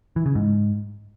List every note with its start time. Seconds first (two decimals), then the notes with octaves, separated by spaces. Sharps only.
0.16 E3
0.26 C#3
0.35 G#2